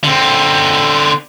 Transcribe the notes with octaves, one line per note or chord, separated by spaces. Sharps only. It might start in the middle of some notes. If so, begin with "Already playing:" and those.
D3 C4